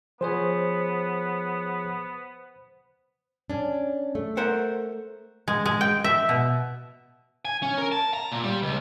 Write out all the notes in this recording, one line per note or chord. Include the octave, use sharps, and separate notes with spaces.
F3 B3 G#4 C5 C#5
C#4 D4
A3
A#4 C5 F#5
G#3
G#3
G5
E5
B2
G#5
C#4
A#4
A5
A#5
A#2
G3
C#2